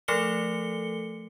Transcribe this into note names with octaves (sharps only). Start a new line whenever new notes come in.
F3 A3 A4 C#7 G7